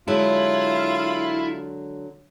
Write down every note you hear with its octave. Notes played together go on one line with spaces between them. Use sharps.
D3 F#3 G#3 E4 F4